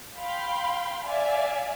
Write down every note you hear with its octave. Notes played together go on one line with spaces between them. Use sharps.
F5 G5 B5 C6
D5 E5 F5 G#5